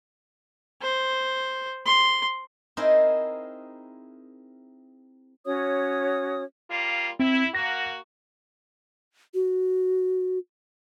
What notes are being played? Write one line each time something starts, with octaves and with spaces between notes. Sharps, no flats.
C5
C6
C4 D#4 E4 G#4 A#4 C5
C#4 F#4 C#5 D#6
G3 A#3 F4
C4 E4
A#3 F#4 A#6
F#4